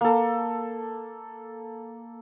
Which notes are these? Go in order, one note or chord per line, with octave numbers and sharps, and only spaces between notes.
A#3 A4